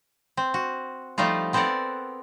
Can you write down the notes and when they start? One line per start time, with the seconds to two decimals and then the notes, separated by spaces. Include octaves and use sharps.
0.37 C4
0.54 F#4
1.18 F3 G3 A3 D#4 F4
1.53 B3 C4 A4 A#4 D5 F#5